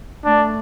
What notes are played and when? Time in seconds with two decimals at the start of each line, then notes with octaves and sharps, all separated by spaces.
0.25 A3 D4